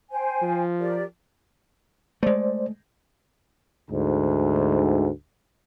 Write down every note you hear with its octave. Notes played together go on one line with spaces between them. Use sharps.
C5 G5 G#5
F3
G4 A#4 D5
G#3 A3 C5 D5
D2 G#2